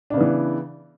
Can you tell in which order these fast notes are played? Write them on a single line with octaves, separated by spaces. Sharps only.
D4 C#3 B3 E3